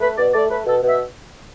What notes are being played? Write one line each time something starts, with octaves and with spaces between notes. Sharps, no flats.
A3 B4
B2 D5
A3 D5
A3 B4
B2 A4
B2
E5